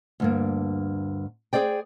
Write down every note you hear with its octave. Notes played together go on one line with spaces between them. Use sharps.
D2 G2 A#3
G#4 A4 C5 D5 G5